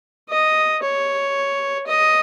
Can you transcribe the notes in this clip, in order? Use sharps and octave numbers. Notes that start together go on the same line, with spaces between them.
D#5
C#5
D#5